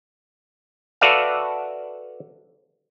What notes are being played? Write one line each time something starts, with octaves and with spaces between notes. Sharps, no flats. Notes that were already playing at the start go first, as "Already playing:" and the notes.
F#4 A4 B4 D5 E5 F5